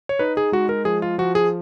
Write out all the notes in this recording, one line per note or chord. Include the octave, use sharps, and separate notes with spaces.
C#5
D#4 B4
G#4
G#3 F#4
A#4
F3 G#4
F4
F3 F#4
G#4